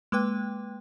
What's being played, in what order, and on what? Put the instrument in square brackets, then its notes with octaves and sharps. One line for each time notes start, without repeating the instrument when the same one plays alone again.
[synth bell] G#3 A#3 B4 G5